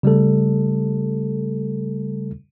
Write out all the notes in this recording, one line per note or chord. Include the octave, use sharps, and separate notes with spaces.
C#3 G3 A3 A4